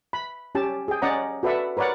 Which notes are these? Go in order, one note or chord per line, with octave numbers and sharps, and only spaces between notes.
B5
C#4 G4 A5
G#4 G5
C#4 D5 D#5 F#5 A#5
F#4 A4 B4 D5 E5 F#5
A#4 B4 C#5 D5 F#5